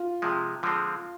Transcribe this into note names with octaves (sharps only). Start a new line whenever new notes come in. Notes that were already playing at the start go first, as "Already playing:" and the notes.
Already playing: F4
C3 F3 G#3
D3 F3 G#3 C4